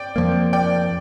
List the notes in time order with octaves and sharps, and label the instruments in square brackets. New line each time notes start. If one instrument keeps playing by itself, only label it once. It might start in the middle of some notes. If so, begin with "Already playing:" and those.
Already playing: [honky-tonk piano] D5 G5
[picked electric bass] F2 F3 A#3
[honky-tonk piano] D5 G5